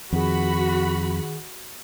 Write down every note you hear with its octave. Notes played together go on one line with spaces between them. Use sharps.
F2 D#3 F#4 G#4 B5